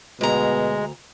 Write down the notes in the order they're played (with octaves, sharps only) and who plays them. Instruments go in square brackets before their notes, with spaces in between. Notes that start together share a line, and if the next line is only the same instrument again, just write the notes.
[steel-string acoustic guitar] D2 A#5 [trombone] B2 [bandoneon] G#3